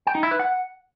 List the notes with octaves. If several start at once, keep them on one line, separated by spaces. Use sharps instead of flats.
G5
D#4
E4
B4
F#5